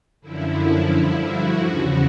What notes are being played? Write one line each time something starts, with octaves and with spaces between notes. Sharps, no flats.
F#2 D3 F3 E4
G2 D3 F3
F#4
E2 C#3 F3